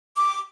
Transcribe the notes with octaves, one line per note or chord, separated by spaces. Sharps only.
D6